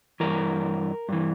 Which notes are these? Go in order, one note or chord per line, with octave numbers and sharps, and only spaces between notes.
G2 E3 A#4
G2 E3